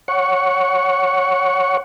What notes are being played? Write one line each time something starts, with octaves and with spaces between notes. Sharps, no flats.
C#5 F#5 C#6